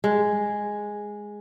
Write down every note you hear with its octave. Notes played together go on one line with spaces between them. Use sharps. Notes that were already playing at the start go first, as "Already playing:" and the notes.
G#3